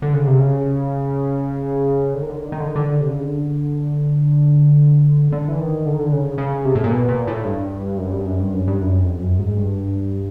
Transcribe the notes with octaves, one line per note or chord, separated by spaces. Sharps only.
D3
C#3
C3
C#3
D3
D#3
D3
D#3
D3
D#3
D3
D#3
D3
C3
C#3
D3
D3
E3
D#3
D3
D#3
D3
C#3
C#3
C3
A2
A#2
B2
A#2
A2
G2
F#2
G2
F#2
G2
F#2
G2
F#2
F2
F#2
G#2
G2